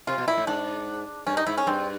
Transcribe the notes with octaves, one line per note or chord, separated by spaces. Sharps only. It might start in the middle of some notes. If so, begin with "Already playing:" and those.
C3 F4
B2
A#2 E4
A2
G#2 D4
G2 C#4
D#4
G#2 E4
C#4
G2 C4